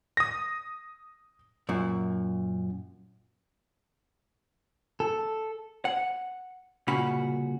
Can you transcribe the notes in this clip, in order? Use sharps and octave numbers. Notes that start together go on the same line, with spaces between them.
D#6 A#6
F#2 A#2
A4
F#5
C2 A#2 C#3 F#4 B5